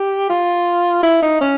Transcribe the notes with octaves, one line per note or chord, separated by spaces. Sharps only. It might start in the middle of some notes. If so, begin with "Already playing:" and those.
Already playing: G4
F4
E4
D#4
C#4